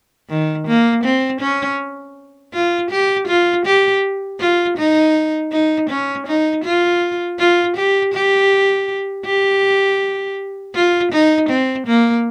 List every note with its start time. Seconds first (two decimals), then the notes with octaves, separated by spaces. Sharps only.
0.29 D#3
0.67 A#3
1.04 C4
1.41 C#4
2.53 F4
2.91 G4
3.28 F4
3.65 G4
4.40 F4
4.78 D#4
5.52 D#4
5.90 C#4
6.27 D#4
6.64 F4
7.39 F4
7.76 G4
8.14 G4
9.25 G4
10.75 F4
11.12 D#4
11.49 C4
11.87 A#3